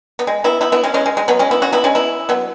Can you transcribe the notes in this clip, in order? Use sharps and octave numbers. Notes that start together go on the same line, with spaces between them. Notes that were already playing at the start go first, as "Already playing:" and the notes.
B3
G#3
B3 E4
B3 E4
B3 E4
G#3 C#4
G#3 C#4
G#3
G#3
F#3 B3
G#3 C#4
B3 E4
C#4 F#4
B3 E4
G#3 C#4
B3 E4
F#3 B3